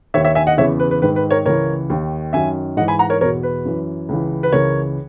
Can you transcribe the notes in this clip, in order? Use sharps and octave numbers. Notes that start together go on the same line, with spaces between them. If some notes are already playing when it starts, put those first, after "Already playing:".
D#2 D#3 C#5 E5
C#5 E5
E5 G#5
D#5 F#5
E2 C#3 E3 C#5 E5
B4
B4
G#2 D#3 B4
B4
A#4 C#5
C#2 C#3 E3 A#4 C#5
D#2 D#3
F#2 D#3 E5 G#5
G#2 E3 D#5 F#5
G#5 B5
F#5 A#5
A#4 C#5
E2 B2 A#4 C#5
B4
F#2 E3
C#2 C#3 E3
B4
C#2 C#3 E3 A#4 C#5